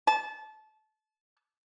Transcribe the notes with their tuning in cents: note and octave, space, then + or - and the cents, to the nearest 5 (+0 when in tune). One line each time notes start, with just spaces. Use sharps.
A5 -25